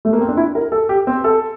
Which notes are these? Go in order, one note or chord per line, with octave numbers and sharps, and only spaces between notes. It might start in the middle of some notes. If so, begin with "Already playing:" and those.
A3
A#3
C4
D4
E4
A#4
A4
G4
C4
A4